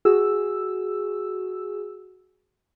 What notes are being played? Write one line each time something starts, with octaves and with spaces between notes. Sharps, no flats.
F#4 G#4 E6